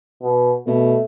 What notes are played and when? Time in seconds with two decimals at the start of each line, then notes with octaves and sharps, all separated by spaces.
0.22 B2
0.67 B2 A3